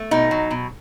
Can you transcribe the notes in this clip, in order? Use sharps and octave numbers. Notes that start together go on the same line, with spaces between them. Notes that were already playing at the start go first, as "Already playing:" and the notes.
Already playing: A3
B2 D#4
F#3
B2